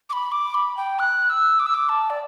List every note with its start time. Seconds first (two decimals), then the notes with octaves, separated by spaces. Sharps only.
0.10 D6
0.13 B5
0.32 D6
0.54 B5
0.77 G5
0.99 F#6
1.30 E6
1.59 D6
1.66 E6
1.74 D6
1.89 A5
2.10 D5